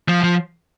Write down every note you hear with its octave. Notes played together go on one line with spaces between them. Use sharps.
F3
F3